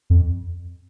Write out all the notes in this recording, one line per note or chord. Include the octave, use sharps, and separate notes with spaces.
F2